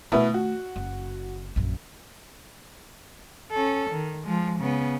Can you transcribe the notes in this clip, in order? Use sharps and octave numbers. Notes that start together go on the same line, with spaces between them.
B2 D#3 A3 E4 B4
F#4
F#1
A#1 F#2
C#4 A4
D#3
F3 G#3
C#3 B3